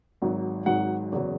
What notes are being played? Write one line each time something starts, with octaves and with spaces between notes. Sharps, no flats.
G#1 G#2 F#3
G#1 G#2 F#3 F#5
F#1 E2 C#3 F#3